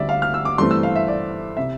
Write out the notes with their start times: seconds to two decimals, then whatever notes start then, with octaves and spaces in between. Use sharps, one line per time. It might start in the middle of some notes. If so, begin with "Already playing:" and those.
Already playing: D2 D3 G3 C4 D5 E5
0.09 F5
0.22 F6
0.34 E6
0.45 D6
0.58 G2 E3 A3 C4 C6
0.71 E6
0.83 F5
0.96 E5
1.08 D5
1.57 C3 E5